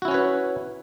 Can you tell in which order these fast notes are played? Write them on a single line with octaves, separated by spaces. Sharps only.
F#4 E4 C#4 C#5 B4